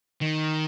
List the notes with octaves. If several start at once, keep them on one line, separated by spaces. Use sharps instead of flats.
D#3